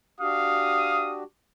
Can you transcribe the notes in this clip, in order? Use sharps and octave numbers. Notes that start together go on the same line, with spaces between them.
D4 F#4 G4 F5 D#6